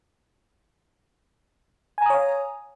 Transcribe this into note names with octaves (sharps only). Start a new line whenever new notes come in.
C#5 F5 G#5 A#5 D#6